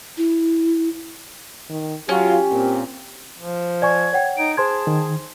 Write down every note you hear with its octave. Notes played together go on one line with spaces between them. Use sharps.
E4
D#3
F#3 C#4 F4 G4
A#2 C4
F3
D5 G#5 C#6 G#6
C#5 F#5 G5
D#4 D7
G#4 C5 A5 C6 G#6
D#3